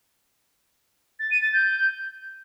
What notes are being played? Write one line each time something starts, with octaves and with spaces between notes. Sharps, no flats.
A6
D#7
A6
G6